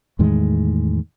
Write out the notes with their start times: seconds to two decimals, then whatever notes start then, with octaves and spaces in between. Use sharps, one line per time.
0.19 E2 A2 D#3 G#3